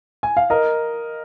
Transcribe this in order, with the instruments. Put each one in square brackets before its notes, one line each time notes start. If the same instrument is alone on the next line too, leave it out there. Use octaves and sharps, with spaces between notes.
[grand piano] G#5
F5
A#4 D#5